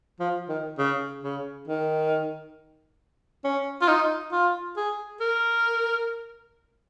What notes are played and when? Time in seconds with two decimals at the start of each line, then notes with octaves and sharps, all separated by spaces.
0.20 F3
0.49 D#3
0.78 C#3
1.23 C#3
1.68 D#3
3.44 C#4
3.81 F4
3.88 D#4
4.32 F4
4.77 G#4
5.21 A#4